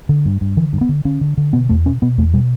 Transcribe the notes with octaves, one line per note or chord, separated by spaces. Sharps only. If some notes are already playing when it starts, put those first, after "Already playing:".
D3
G2
G2
D3 E3
G2
B3
D3
D3 C#4
D3
D3
B2 B3
E2 A3
B2 C#4
B2 B3
E2 A3
B2 G3